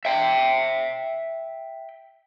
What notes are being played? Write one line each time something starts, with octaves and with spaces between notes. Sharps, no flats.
E5 G5